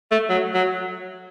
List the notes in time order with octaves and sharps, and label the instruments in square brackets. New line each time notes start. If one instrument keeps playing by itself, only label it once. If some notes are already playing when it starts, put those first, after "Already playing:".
[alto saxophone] A3
F#3
F#3